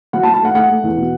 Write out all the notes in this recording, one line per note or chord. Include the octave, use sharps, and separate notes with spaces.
F#3 F#5
A5
F#3
A5
A3 F#5
A3 F#5
A3
E2
B2